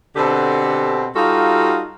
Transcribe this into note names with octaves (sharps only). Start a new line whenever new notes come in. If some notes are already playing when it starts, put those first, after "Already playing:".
B2 D3 C4 G4 A4
G3 D#4 F4 F#4 A4 F5